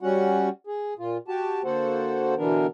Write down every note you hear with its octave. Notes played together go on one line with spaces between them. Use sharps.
G3 C#4 F#4 F#5
G#4
A#2 F4
F#4 G4 A5
D3 A#3 F#4 A4 C5 F#5
B2 D3 E3 B3 D4 A#4